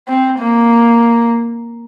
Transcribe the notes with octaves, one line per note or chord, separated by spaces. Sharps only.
C4
A#3